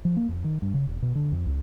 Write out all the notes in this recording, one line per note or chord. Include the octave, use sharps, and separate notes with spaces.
F3
A#3
F2
D#3
G2
C#3
E1
B2
D3
F2
C#2